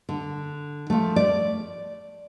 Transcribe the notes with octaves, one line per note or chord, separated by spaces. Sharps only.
D3
F3 A3
D5